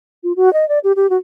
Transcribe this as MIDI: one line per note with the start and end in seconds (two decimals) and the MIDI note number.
0.24 0.33 65
0.36 0.52 66
0.53 0.67 75
0.69 0.79 74
0.84 0.92 67
0.96 1.09 67
1.10 1.17 66